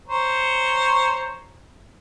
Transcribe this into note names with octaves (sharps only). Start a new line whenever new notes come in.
C5 C#5 A#5